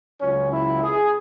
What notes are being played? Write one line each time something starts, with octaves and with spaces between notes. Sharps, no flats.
C#2 C#3 F#3 C#4
E4
G#4